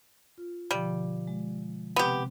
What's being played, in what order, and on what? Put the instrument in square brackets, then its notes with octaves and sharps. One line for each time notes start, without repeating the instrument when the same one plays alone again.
[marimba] F4
[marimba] B2 D3 F3 [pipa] G3
[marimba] G#3
[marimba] C3 C4 [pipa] B3 G4